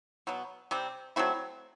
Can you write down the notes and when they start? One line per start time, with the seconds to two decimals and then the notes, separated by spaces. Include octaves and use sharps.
0.27 B2 F#3 B3
0.71 C3 G3 C4
1.16 F#3 A3 C4 E4